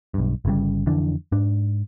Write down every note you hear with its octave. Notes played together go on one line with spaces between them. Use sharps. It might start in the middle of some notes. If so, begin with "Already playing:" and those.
B1 G2
G1 C#3 G3
F2 D3 E3 D4
G#2 D4